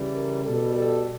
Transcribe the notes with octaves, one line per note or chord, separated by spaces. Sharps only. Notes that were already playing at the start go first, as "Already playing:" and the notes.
Already playing: C#3 E3 G3
A#4
B2 G3 A4
A4